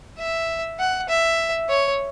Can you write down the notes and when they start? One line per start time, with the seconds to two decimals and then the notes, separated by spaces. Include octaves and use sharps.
0.18 E5
0.80 F#5
1.09 E5
1.69 C#5